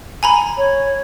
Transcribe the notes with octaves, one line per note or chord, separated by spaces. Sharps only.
G#5 A#5 B5
C#5